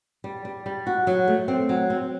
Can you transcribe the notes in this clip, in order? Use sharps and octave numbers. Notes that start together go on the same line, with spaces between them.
G3
G3
G3
F#4
F#3
A3
C4
F#3
C4